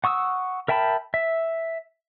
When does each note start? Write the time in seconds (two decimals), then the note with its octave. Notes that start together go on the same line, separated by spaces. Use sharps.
0.04 F#5 C#6 D#6 E6
0.68 A#4 E5 G5 A5 B5
1.14 E5